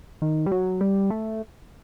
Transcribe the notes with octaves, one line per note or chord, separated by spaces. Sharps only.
D#3
G3
F#3
G3
A3